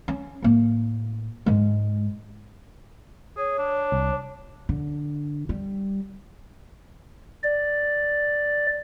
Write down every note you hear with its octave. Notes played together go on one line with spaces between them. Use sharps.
C#4
A2 A#3
G#2 G#3
G#4 C#5
D4
C2
D3
G3
D5